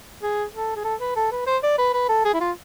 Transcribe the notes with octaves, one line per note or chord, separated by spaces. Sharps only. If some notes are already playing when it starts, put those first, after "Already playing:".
G#4
A4
G#4
A4
B4
A4
B4
C5
D5
B4
B4
A4
G#4
E4
F4